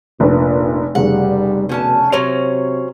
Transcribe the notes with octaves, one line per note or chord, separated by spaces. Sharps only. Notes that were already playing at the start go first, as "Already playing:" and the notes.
F1 A#2 D4 B4
F1 C#3 G3 F#5
B2 D3 C#4 A5
C3 F#3 C#4 C5 C#5 F7